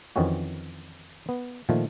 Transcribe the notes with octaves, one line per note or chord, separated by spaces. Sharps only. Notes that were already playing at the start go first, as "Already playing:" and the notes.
F2 D#3 E3 C4 C#4 F#4
B3
A#2 D#3 F3 A3